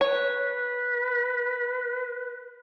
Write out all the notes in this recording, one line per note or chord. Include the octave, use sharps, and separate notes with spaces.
B4 C#5